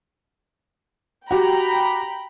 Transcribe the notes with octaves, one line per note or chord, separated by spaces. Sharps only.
F#4 G4 G5 A#5 B5